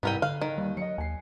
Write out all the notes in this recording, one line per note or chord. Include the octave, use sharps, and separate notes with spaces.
C2 G#2 B3 E4 A#4 G5 D#7
D3 F5 F#6
D#3
D#2 G3
F#3 D#5 C#7
D#2 G#5 C7